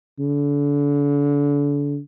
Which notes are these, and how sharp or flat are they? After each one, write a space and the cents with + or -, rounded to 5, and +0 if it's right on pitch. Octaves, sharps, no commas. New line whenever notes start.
D3 -30